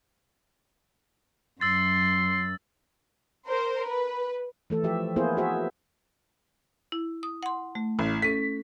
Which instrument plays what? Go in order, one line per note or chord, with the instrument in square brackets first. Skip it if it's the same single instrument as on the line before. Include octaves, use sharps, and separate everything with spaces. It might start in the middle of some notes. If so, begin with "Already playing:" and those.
[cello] F#2 [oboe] C6 [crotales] E6 A6
[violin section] A#4 C5
B4
[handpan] E3 A3 A4
F3 G4 E5
A#3 B3 E4 F4 G#4 C5
F#4 G#4 C5 E5
[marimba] E4
D#6
F#5 C6
A3
[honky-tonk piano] A1
[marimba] C#4 A4 [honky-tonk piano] B6